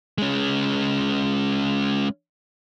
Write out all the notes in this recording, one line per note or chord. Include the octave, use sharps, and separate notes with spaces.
G#3 C#4